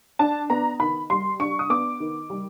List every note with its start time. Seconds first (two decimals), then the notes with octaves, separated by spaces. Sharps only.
0.19 D4 A5
0.50 B3 A#5
0.80 D#3 B5
1.10 G3 C6
1.40 D4 C#6
1.59 D#6
1.70 B3 D6
2.00 D#3
2.30 G3